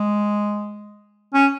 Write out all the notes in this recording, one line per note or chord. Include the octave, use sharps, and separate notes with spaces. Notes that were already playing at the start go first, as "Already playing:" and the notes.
Already playing: G#3
C#4